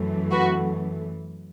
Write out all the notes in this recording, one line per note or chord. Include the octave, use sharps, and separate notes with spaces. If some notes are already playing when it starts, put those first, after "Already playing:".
Already playing: F#2 E3 A3
F#4 B4